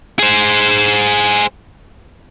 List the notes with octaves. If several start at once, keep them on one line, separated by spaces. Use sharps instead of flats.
G#4 C5